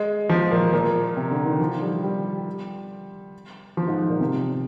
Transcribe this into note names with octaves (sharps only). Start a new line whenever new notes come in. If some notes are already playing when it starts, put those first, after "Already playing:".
Already playing: G#3
F3
A#2
A#2
C3
D3
D#3
F3
G3
G3
F3
G#2
A#2
C3